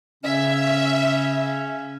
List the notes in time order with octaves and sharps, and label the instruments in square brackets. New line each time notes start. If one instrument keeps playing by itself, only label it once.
[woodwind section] C#3 C#4 [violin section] E5